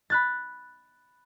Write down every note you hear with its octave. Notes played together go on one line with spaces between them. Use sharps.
B5 F#6 A6